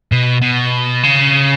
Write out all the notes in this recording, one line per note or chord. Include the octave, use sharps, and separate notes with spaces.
B2
B2
C#3